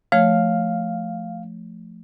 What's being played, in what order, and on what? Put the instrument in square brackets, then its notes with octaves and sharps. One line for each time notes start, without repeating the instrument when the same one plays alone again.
[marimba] F3 A3 C#5 [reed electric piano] F5